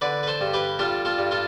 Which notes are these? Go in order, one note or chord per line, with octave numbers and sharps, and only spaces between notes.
D3 B4 D5
B4
A4 C5
G2
G4 B4
G3 F4 A4
F4 A4
G2
F4 A4